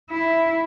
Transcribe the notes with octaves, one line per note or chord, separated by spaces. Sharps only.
E4